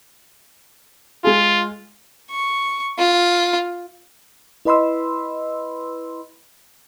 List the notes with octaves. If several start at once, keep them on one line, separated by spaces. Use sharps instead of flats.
G#3 F4 G#4
C#6
F4
E4 B4 D#5 B5 C6 E6